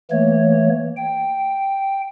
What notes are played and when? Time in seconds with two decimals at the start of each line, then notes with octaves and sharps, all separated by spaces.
0.11 E3 A3 A#3 C#5
0.97 G5